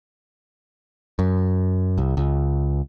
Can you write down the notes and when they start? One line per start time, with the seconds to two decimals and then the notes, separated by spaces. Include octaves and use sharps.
1.19 F#2
1.98 C2
2.17 C#2